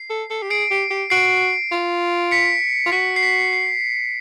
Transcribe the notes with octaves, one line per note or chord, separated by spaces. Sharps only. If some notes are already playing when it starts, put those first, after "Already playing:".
Already playing: C7
A4
A4
G4
G#4 C7 D7
G4
G4
F#4 C7 D7
F4
B6 C#7
F4
F#4 B6 C#7
C7
B6
C7